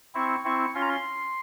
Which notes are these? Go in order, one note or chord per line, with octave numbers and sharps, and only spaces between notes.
C4 E4 C#6
C4 E4 C#6
C#4 F4 C6
A#5
C6